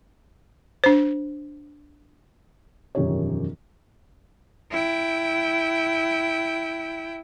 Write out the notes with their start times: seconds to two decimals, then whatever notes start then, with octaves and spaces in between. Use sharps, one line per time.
0.84 D4 C5
2.95 E1 F#2 D#3 F3 G4 C#5
4.71 E4 G5